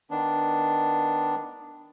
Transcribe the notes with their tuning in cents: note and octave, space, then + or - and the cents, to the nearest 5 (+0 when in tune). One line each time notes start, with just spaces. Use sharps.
D#3 +0 B3 +0 D4 +0